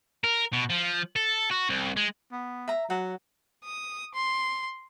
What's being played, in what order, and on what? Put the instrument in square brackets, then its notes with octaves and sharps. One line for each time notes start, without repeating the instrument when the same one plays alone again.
[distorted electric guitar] A#4
B2
F3
A4
F#4
C2
G#3
[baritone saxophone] B3
[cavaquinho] E5 A#5
[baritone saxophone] F#3 [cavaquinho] F#5
[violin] D#6
C6